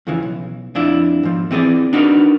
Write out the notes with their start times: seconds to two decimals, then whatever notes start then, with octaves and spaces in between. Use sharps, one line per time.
0.07 F2 C#3 E3
0.23 B1
0.75 F2 D4 E4
1.23 G#2 F3
1.51 E3 C4 G#4 C#5 D5
1.93 D4 D#4 F#4 G4 A#4 B4